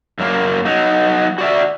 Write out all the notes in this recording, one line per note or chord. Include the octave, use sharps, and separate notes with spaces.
F#2 F#3 A#3
F#3 D#4
F#4 D5 E5